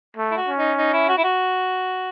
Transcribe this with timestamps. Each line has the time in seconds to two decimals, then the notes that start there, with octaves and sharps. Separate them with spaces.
0.17 A3
0.32 E4
0.37 F#4
0.48 C#4
0.58 D#4
0.78 D#4
0.93 E4
1.09 F#4
1.18 E4
1.24 F#4